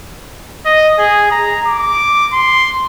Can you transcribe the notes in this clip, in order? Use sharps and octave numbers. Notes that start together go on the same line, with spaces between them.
D#5
G#4
A#5
D6
C6